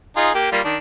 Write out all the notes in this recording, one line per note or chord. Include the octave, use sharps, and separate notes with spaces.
D#4 F4 G#4
A#3 G4
G3 A#3 F4
D#3 D4